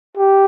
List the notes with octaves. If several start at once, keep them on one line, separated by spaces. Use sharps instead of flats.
G4